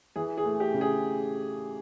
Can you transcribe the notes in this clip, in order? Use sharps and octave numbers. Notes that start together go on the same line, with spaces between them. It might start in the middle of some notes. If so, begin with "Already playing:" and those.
E3 G#4
G#4
A3
G4
C#3
G#4